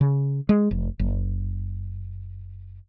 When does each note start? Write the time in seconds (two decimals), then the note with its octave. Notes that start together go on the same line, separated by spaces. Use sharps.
0.01 C#3
0.49 G#3
0.71 F1
0.99 F#1